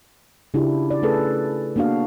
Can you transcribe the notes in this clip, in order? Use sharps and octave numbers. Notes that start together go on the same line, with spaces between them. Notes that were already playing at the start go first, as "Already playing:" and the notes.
C#3 D4 E4 F4 G4
D5
A3 C#4 G#4 A4 B4
A#3 B3 D4 F#4 F5